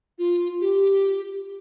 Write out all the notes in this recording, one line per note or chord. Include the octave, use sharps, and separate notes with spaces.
F4
G4